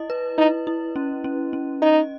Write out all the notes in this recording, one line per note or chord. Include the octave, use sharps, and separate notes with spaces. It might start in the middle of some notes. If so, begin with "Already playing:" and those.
Already playing: E4 D#5
B4
D#4 E4
E4
C#4
C#4
C#4
D#4 D#5